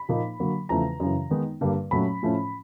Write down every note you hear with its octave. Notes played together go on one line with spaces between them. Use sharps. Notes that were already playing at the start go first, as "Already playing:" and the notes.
Already playing: B5
A#2 F3 A#3 D#4
D3 F#3 A#3
E2 C#3 F3 A3 A#5
F#2 C#3 E3
D#3 G#3 B3 D#4
G2 D3 G3 A#3
A#2 F#3 A3 C#4 B5
A2 F3 A3 C#4